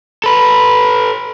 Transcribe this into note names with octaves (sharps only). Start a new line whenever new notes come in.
A4 B4